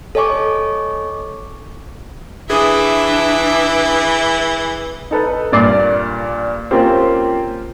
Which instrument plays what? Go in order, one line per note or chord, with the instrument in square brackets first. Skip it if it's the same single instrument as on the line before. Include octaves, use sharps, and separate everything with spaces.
[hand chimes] A4 C#5 D#5 G#5 C#6 D6
[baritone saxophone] E3 [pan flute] D4 [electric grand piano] G#4 D#6 [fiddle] E5 D6
[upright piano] D#4 A4 B4
G2 A#2 D5 D6 C7
A#3 C4 C#4 F4 G4 C5